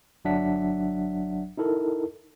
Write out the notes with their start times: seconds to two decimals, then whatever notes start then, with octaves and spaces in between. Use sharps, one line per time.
0.25 G1 F#3 D4 E5 F#5 B6
1.57 D#4 E4 A4 A#4